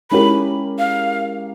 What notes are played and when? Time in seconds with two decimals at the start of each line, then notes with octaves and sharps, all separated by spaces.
0.10 G#3 C#4 E4 G4 A#4 B5
0.78 F5